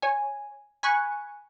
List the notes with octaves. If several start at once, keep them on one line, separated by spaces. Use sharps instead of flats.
C#5 G#5
G#5 B5 C#6 F#6